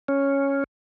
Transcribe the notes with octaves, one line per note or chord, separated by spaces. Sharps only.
C#4